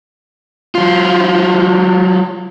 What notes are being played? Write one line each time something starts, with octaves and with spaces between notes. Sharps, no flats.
F#3 F4